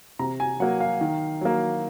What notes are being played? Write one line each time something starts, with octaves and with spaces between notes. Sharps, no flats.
C3 A#5
G#5
F#3 A#3 F#5
F5
D#3
F#3 A#3